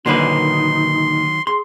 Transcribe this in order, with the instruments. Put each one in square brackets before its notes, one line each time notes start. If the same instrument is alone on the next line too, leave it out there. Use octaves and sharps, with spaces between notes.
[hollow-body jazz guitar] A#2 D3 B4 [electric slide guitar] D#3 F#3 [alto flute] D#4 [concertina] C6
[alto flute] G#4 [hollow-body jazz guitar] C6